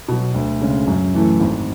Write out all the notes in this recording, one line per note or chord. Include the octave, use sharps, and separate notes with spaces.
B2 F#3
D2
C#3 G#3
F#2
E3 A3 E4
G#1